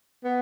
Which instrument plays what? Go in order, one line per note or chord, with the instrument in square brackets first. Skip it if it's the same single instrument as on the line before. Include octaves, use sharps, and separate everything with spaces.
[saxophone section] B3